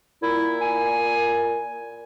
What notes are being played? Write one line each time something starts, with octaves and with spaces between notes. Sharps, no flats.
A#2 E4
G#5